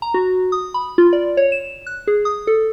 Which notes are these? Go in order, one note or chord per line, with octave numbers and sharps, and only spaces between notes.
A#5
F#4
D#6
B5
F4
D5
C#5
E7
F#6
G#4
D#6
A4